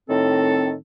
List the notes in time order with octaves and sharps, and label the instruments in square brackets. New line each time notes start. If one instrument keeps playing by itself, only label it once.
[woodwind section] A2 D#3 C4 A4